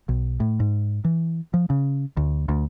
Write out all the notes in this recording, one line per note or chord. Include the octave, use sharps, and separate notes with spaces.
B1
A2
G#2
E3
F3
C#3
D2
D2